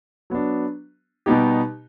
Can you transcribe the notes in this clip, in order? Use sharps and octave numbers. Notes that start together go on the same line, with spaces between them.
F#3 B3 D4
B2 G3 B3 D#4 G4